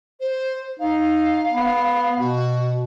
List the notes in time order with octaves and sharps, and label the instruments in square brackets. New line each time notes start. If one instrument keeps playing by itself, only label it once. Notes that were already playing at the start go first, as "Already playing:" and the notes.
[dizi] C5
[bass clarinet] D#4 [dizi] F5
[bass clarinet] B3
[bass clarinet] B2 [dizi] F#4